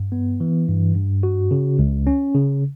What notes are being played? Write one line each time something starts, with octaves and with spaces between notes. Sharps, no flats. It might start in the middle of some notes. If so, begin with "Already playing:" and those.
Already playing: G2
B3
E3
G2
G2
F#4
C#3
C#2
C#4
C#3